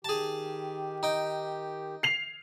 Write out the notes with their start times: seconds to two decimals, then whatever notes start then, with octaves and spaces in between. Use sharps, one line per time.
0.05 D#3 G4 G#4 A5
1.03 D#4 G5
2.03 C7 F7